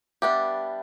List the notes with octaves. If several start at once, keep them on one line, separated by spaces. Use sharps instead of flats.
G3 B3 D4 G4 E5